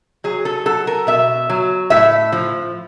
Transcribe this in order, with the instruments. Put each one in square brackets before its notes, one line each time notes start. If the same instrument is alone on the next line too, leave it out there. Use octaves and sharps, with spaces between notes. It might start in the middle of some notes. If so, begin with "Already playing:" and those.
[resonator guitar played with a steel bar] F#3 G#4
A4
F#3 A4
A#4
B2 E5
F#3
A2 E5
F3